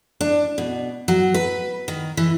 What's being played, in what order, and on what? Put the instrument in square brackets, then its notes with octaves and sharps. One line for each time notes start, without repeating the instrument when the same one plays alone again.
[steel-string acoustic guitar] D4
B2
F#3
B4
D#3
E3